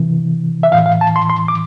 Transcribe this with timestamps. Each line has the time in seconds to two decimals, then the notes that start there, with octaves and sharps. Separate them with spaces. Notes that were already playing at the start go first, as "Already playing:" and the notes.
Already playing: C3 E3
0.63 E5
0.72 A2 E3 F5
0.86 F5
1.01 A5
1.16 C6
1.30 C6
1.48 D6